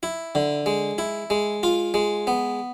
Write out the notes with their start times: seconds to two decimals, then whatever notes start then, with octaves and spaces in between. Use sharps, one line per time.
0.03 E4
0.35 D3
0.66 G#3
0.98 E4
1.30 G#3
1.63 F4
1.94 G#3
2.27 B3